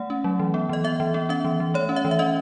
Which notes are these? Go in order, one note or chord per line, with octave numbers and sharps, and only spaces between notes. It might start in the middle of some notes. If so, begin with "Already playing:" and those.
Already playing: A3 F#5
C#4
F#3
E3
B3
E3 D#5
B3 E5
E3
B3
C#4 E5
E3
E3
A3 C#5
C#4
E5
E3
E5
C#4 D#5